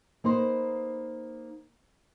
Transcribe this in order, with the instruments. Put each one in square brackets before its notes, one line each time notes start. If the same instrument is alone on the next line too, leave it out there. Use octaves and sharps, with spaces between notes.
[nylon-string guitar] A#3 D#4 B4 C5